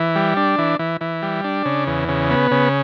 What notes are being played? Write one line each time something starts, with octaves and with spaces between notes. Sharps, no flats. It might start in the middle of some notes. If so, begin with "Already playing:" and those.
Already playing: E3
G3
D4
E3
E3
E3
G3
D4
C#3
E2
C#3
B3
C#3